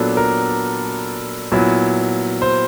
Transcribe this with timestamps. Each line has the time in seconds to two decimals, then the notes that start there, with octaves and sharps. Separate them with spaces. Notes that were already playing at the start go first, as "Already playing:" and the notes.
Already playing: A#2 F#3 B3 D4 A4
0.17 A#4
1.52 A#2 F#3 B3 E4
2.42 C5